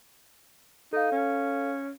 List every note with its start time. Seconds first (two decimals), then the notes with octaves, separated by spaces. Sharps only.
0.93 D#4 A4 F5
1.12 C#4